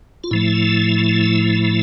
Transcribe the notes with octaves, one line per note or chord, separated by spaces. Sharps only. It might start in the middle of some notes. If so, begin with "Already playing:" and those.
F4
A2 F3 A3 E4